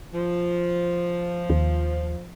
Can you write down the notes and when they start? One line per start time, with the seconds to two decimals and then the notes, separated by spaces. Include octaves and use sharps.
0.13 F3
1.50 D#2